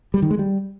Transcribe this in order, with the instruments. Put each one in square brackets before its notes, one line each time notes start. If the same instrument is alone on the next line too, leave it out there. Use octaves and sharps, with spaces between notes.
[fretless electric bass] G3
D#3
G#3
G3